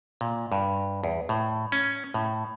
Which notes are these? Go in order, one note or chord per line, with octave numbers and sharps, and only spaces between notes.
A#2
G2
E2
A2
C#4
A2